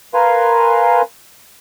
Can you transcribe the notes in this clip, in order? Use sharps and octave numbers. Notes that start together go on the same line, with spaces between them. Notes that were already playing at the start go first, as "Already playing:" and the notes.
A#4 B4 F5 G#5 C6